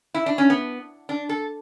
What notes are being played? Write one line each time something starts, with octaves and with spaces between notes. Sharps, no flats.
E4
D4
C#4
B3
D4
A4